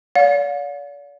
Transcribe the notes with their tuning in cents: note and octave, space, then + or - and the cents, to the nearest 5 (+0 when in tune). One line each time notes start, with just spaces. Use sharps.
D5 -40 F5 +40